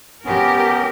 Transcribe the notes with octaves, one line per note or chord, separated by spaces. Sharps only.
B3 C#4 G4 A#4